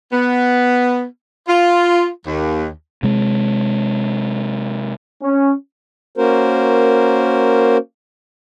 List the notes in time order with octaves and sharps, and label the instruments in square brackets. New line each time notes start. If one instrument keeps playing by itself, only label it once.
[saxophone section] B3
F4
D#2
[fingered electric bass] C3 G#3
[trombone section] C#4
[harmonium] A#3 C#4 F#4 A#4 C5